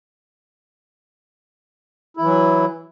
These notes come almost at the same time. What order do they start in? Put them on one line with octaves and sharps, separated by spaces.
E4 E3 F#3